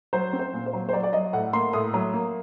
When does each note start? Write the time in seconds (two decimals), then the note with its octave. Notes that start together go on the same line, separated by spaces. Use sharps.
0.13 F#3 C5
0.33 C4
0.39 C5
0.53 A#2
0.66 C5
0.73 F#3
0.89 C5
0.93 F#3 D5
1.03 D5
1.13 F#3 D#5
1.33 A2 F#5
1.53 A#3 C6
1.73 A2 D#6
1.94 F#3
2.14 A#3